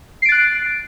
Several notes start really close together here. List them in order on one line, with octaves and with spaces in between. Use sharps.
C7 D7 A6 F#6